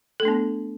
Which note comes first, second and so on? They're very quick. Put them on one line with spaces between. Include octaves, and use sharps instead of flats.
A4 A3 D4 B3